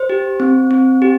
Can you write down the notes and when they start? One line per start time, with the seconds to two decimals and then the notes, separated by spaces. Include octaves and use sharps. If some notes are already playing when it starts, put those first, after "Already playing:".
Already playing: C5
0.10 G4
0.40 C4
0.71 C4
1.02 G4